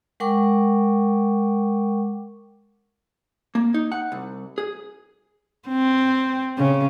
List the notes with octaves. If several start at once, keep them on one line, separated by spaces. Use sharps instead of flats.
G#3 A#4 F#5 G5 C#6 D6
A#3
D#4
F#5
C2
G#4
C4
C#3